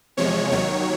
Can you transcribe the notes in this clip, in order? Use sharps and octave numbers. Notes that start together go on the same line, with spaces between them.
E2 C3 F3 G#3 C#5
D#2 D#3 F#3 C#5